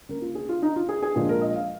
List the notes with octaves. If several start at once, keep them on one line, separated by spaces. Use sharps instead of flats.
C#2 C#3 A#3 A#4
F4
G#4
F4
D#4
F4
G#4
G#4
A#1 A#2 F3 G#3 G#4
A#4
D#5
F5